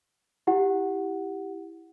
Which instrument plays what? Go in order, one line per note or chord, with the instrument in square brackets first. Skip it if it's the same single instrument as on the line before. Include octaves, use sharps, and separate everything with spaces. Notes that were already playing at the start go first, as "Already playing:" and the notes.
[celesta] E4 G4 F#5